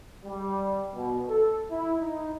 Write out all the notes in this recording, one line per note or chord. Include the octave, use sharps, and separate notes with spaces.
G3
B2
A4
E4
D#4